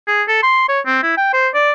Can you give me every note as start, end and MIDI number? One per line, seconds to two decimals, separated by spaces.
0.07 0.23 68
0.28 0.42 69
0.43 0.66 84
0.69 0.80 73
0.86 0.99 60
1.03 1.17 64
1.17 1.29 79
1.33 1.49 72
1.54 1.73 74